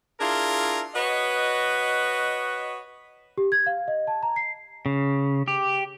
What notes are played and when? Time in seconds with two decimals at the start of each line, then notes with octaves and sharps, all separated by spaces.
0.20 D4 E4 F4 G#4 A#4
0.95 F#4 B4 C#5 D#5
3.38 G4
3.52 G#6
3.66 F5
3.88 D#5
4.07 A5
4.23 A#5
4.36 C7
4.86 C#3
5.48 G4